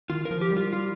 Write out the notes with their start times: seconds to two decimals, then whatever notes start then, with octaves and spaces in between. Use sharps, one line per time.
0.10 D#3 F4
0.25 A#4
0.31 F3
0.41 G4
0.52 G3
0.57 F4
0.73 F4